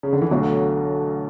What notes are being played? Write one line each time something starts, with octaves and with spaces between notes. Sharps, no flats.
C#3
D3
E3
B1 B2 D3 F#3 A3